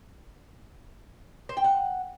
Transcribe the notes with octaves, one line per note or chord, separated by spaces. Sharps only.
C5
G5
F#5